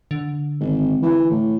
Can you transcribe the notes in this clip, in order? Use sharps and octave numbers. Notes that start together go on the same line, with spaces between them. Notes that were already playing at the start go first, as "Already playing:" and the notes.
D3
G#1
E3
A2